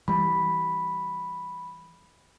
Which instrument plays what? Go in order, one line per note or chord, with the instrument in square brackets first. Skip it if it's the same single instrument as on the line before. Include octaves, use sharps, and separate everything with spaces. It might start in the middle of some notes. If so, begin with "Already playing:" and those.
[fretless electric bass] E3 G3 [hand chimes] B5